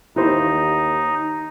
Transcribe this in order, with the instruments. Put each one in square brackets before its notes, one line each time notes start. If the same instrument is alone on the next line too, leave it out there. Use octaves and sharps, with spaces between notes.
[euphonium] D#2 [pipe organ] D#4 [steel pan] E4 G4 C5